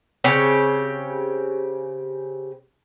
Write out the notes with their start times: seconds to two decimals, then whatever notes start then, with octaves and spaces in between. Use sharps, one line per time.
0.24 C#3 C4 G4 C#5